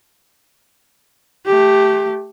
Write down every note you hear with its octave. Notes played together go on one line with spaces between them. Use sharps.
A3 G4